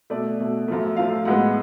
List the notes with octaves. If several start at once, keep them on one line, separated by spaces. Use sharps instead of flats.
B2 A3 D5
B2 A3
F#2 F3 A3
F#2 F3 A3 F5
A2 G#3 B3 F#5